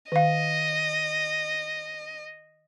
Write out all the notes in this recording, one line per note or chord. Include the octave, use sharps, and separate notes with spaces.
D#3 D#5 F5